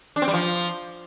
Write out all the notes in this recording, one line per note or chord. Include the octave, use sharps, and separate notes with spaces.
D4
C4
G3
F3